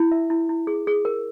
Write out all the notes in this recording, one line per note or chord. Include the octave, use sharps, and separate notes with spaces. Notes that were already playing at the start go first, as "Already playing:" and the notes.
Already playing: E4
E5
E4
E4
G#4
G#4
A#4